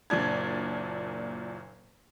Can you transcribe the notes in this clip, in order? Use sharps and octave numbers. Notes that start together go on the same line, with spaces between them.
F#1 A#2 D4 G#6